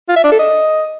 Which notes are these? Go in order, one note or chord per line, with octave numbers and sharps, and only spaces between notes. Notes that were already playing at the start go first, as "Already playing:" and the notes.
F4
E5
D4
A4
D#5